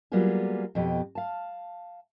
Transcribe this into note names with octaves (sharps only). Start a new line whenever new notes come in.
F#3 G3 A#3 B3 F4 G#4
F2 B2 G4
F5 A5